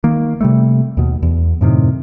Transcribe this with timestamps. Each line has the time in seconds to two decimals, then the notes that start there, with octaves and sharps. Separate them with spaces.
0.04 D#3 A#3
0.41 C3 G3 A3
0.97 D#2 B2
1.23 E2
1.61 F#2 A2 C3 D#3